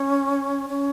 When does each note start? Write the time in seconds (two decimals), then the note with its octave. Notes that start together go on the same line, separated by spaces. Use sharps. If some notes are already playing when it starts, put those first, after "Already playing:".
Already playing: C#4
0.69 C#4